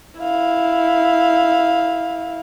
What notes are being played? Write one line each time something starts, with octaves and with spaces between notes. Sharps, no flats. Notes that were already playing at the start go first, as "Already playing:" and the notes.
E4 F5